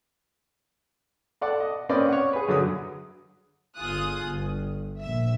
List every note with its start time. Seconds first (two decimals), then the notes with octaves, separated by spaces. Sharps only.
1.41 A4 D5 F#5
1.60 D#5
1.89 A#3 C4 C#4 B4 D5 D#5
2.09 C#5 F#5
2.33 G#4 B4
2.48 F#2 D3 F#3 D#6
3.76 G1 F4 G#4 D#6 F#6
4.26 G1
5.00 A#1 E5